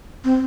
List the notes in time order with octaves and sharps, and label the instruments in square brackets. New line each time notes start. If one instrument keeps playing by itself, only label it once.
[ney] C4